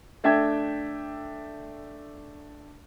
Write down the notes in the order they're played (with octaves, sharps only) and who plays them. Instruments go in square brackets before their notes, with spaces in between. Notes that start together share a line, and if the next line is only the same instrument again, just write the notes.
[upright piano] A3 D4 E5 G5 G#6